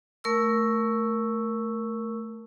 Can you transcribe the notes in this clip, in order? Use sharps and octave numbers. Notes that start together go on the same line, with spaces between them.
A3 A#4 C#6 E6